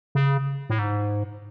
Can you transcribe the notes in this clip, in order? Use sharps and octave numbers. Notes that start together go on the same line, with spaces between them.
C#3
A2
G#2